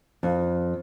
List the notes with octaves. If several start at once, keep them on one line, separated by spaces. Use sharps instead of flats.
F2